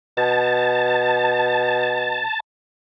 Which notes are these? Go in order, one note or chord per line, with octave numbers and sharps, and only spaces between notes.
B2 A5